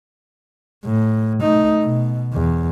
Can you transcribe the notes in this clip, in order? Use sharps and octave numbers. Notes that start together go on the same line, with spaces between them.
A2
A3 D#4
B2
E2